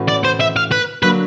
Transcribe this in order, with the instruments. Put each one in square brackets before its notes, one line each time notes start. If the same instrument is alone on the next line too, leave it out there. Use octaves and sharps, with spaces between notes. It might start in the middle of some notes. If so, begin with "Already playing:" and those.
Already playing: [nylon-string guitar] A2 E3 A3 C#4 F#4
[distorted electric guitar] D5
C5
E5
F5
B4
[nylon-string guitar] D3 F#3 A#3 D4 [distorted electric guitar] B4